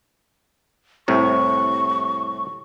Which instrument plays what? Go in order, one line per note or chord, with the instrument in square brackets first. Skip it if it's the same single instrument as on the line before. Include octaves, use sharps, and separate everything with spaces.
[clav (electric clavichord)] C2 A2 C3 [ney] C#6